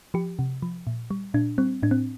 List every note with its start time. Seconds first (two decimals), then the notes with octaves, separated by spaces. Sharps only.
0.14 F3 G4
0.39 C3
0.62 F3
0.87 A#2
1.11 G3
1.34 A#2 D4
1.58 G3 C4
1.83 A2 D4
1.91 C4